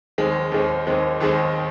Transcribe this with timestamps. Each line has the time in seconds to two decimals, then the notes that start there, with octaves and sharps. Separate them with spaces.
0.18 D#2 D#3 G#3 C4
0.52 D#2 D#3 G#3 C4
0.87 D#2 D#3 G#3 C4
1.20 D#2 D#3 G#3 C4